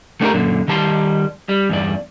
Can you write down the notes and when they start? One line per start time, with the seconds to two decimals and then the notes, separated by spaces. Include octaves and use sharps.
0.21 A3 B3 D4 E4 G4 A#4
0.34 F#2 A#2 D3
0.68 D#3 G3 A5 B5 C6
1.49 G3
1.69 E2 G2 D5